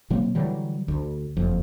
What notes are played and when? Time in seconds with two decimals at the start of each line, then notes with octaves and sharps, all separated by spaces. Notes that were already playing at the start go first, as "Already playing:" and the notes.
0.10 B2 F#3 A#3 C4
0.35 D3 E3 F#3 G3
0.88 D2
1.37 F#1 F2